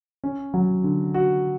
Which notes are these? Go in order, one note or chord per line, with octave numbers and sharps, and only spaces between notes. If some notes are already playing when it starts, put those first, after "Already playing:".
C#4
F#3
D3
F#4